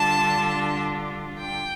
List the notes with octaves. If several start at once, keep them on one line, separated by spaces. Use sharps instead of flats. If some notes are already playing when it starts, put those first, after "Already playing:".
Already playing: D3 G3 D4 F4 A5
G5